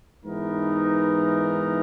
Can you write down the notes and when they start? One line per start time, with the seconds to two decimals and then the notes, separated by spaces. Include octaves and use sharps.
0.24 G#2 E3 B3 D#4 A#4